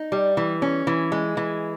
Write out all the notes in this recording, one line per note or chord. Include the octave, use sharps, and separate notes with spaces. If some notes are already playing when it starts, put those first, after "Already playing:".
Already playing: D#4
G3
E3
C#4
E3
G#3
E3